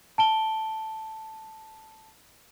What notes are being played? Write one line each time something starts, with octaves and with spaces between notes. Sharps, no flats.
A5 D7 G7